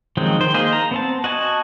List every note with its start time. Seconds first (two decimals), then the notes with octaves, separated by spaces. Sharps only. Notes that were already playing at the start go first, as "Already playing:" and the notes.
0.17 D#3 F3 F#3 G#3 C4
0.40 D#3 C5
0.54 A#3 D#4 G#4 C5
0.73 A#5
0.91 B3 C4 A5
1.24 F#4 D#5 G#5 A5